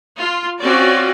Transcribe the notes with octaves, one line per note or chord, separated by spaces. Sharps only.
F4
C4 C#4 F4 F#4 D5